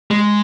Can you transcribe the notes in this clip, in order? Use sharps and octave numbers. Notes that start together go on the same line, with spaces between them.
G#3